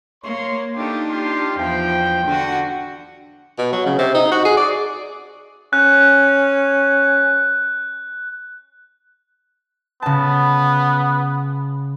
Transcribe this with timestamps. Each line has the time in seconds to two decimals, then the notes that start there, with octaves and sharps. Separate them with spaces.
0.23 A#3 C#5 C6
0.76 A3 D4 D#4 F4 G4
1.08 F4 G4 C6
1.57 E2 F3 G5
2.24 D3 F#4
3.58 B2
3.73 F#3
3.86 C#3
3.99 C3
4.15 D#4
4.32 F#4
4.45 G#4
4.57 D5
5.73 C#4 F#6
10.02 C#3 B3 A5